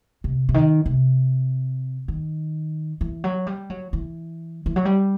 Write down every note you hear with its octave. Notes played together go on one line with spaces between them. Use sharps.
C3
C3
D#3
C3
D#3
E3
F#3
G3
F#3
E3
E3
F#3
G3